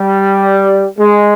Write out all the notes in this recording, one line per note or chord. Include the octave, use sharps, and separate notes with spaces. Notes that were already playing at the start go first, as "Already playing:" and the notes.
Already playing: G3
G#3